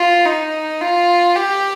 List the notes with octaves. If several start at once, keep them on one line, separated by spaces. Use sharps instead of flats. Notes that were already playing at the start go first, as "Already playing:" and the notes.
Already playing: F4
D#4
F4
G4